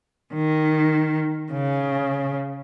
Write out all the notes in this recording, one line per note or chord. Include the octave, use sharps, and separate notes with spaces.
D#3
C#3